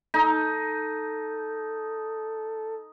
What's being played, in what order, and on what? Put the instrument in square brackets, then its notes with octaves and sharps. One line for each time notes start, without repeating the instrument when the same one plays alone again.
[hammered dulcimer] D#4 [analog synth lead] A4